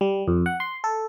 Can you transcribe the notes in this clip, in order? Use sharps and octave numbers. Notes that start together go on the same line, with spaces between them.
G3
F2
F#5
C6
A4